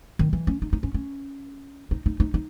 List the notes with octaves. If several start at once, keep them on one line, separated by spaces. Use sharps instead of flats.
D#3
E3
C#4
D#4
D#4
C#4
C#4
D#4
D#4
D#4
D#4